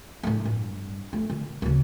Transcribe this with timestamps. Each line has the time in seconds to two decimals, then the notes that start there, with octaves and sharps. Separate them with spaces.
0.23 A2 A3
0.45 G2
1.13 A3
1.30 D3
1.62 D1 C#3